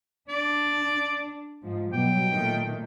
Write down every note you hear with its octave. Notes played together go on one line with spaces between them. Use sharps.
D4 D5
G#2 F3
B2 F#3 G3 G5
A#2 D#3 A3